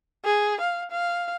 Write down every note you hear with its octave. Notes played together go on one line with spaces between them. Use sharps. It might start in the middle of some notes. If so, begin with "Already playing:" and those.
G#4
F5
F5